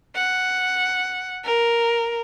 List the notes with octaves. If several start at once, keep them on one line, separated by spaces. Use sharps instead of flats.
F#5
A#4